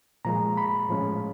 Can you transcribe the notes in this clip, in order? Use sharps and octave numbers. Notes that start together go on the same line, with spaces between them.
A#2 F3 G#3 A#5
B5
A2 F3 G#3 C#4